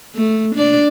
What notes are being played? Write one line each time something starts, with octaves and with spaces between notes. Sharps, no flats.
A3
D4 D5